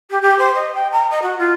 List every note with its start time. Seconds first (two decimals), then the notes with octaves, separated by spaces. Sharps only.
0.10 G4
0.21 G4
0.38 C5
0.54 D#5
0.74 G5
0.91 A#5
1.10 D#5
1.22 F#4
1.38 F4